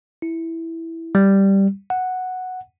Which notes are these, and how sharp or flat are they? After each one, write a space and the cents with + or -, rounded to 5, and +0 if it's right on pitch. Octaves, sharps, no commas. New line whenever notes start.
E4 -5
G3 +0
F#5 -5